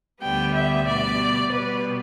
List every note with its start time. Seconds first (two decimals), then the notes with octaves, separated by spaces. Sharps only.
0.22 D2 D3 G3 B3 G5
0.54 E5
0.86 B2 G3 B3 D5
1.51 B2 G3 B3 B4